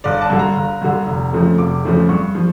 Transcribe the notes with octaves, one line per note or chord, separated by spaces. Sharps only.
G1 D5
A5
G2 D3
A#5
G1
G2 D3
F1
F2 C#3 F3 A3
F1 D6
F2 C#3 F3 A3
G2 C#6
F3